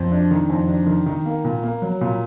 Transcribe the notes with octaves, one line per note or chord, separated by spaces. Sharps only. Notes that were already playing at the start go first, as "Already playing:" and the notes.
Already playing: F2
D4
D#3
F2
D4
D#3
D#3
A#3
A#2
A#3
F#3
A#2